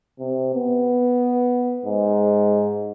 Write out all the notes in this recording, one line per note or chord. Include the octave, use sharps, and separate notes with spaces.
C3
B3
G#2